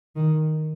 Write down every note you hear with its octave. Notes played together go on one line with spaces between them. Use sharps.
D#3